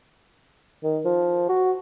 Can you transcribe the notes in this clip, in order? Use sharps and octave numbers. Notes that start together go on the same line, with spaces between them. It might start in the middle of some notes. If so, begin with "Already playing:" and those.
D#3
F3
F#4